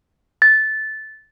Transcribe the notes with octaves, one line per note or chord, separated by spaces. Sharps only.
A6